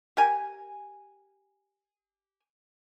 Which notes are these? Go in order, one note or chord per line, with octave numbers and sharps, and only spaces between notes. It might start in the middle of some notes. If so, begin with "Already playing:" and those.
G4 A#4 G#5